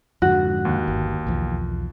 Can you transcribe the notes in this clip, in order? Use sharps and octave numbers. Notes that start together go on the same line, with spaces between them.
F2 G#2 D3 F#4
D#2
G1
B1 E2 F3